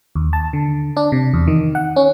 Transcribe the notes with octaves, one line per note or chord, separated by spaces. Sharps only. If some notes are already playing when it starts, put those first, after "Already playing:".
D#2
A5
D3
D4
C3
E2
D#3
F#5
C#4